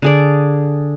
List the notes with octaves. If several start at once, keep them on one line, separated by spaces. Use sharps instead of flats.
D3 G#4 D5